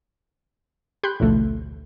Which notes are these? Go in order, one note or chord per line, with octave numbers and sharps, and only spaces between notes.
G4 B5 C6 F#6 G6
A1 D2 B2 F3 A3